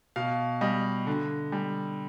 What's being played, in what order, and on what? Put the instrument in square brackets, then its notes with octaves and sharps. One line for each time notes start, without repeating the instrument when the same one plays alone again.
[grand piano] B2 F5
G3 D#5
D3
G3